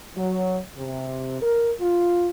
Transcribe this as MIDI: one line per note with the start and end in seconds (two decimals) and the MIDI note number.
0.16 0.59 54
0.77 1.39 48
1.41 1.72 70
1.81 2.30 65